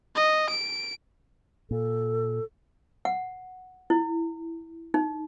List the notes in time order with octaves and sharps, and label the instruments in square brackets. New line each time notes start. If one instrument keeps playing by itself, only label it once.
[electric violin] D#5
D7
[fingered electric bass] A#2 [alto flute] A4
[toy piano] F#5
E4
D#4